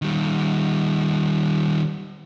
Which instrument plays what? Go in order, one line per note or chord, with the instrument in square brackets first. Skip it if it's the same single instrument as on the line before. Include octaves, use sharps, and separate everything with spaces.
[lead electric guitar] D#3 G3